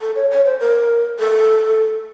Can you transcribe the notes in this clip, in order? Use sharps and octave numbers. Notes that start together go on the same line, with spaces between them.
A4
C#5
C#5
C5
A#4
A4